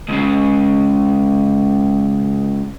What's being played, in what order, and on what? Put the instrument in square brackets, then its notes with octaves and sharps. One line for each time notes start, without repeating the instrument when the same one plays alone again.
[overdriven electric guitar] C#2 C#3